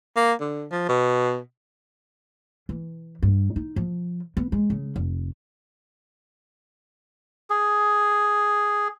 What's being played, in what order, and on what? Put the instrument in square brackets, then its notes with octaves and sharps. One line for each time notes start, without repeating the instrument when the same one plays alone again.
[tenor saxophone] A#3
D3
F3
B2
[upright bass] E3
G2
D#4
F3
B3
G#3
C#3
F1
[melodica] G#4